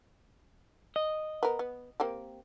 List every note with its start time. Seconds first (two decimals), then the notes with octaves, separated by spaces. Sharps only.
0.96 D#5
1.43 B3 A#4
1.59 B3
2.00 A#3 C4 G4